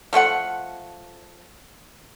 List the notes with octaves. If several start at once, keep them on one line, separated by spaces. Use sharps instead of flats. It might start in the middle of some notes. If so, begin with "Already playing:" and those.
F3 A3 F4 F#5